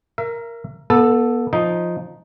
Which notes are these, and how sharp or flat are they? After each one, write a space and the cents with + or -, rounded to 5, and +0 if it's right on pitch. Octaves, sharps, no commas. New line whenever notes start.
A#4 +0 E5 +35
B3 -35 A4 +0
F3 +0 D#4 +0